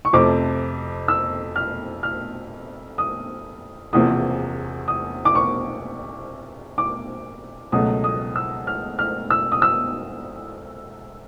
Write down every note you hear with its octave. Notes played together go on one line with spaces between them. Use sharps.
C#6
F2 C3 F3 A3 D6
E6
F6
F6
D#6
E1 E2 C3 F3 A#3 D#6
D#6
D6
C#6
D6
C#2 B2 F#3 A3 D#6
D#6
E6
F6
F6
E6
D#6
E6